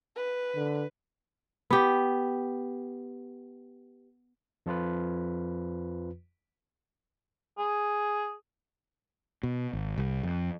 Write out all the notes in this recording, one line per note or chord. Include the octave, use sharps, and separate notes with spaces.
B4
D3
B3 G4
F2 F3 F4 B4
G#4
B2
G#1
C2
F2